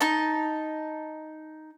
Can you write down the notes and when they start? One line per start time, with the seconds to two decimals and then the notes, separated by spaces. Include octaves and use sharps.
0.01 D#4 A5